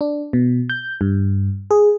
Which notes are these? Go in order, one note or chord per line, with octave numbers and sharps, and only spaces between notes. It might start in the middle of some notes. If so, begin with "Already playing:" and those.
D4
B2
G6
G2
G#4